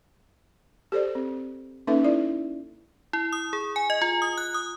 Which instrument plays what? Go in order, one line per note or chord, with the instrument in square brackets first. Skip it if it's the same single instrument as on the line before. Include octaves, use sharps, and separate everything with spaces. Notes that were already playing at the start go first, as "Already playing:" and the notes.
[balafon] G4 A4 C5 D5
C4
A#3 C#4 D#4 A4 B4 E5
E4 D5
[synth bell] E4
D#6
G#4
G#5
D#5
F4
D#6
F#6
D#6